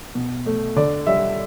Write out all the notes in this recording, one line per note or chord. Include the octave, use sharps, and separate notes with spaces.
B2
A3
D3 D5
G3 E5